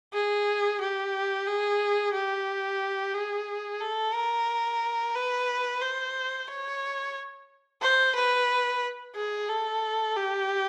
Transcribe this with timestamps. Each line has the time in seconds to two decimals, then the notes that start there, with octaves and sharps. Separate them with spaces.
0.13 G#4
0.81 G4
1.47 G#4
2.14 G4
3.14 G#4
3.81 A4
4.14 A#4
5.15 B4
5.81 C5
6.48 C#5
7.82 C5
8.15 B4
9.16 G#4
9.49 A4
10.16 G4